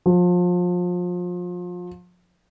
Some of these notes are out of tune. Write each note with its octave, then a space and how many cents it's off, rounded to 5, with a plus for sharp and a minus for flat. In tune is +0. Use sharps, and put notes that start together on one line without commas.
F3 +30